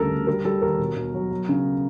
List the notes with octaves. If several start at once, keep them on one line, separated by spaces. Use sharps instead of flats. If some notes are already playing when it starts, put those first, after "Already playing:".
Already playing: D2 C#3 G3 A4 A#4
D2
G3 A#4
G3 A4
D#2 A#4
B2
B2
F#3
F#3
C#3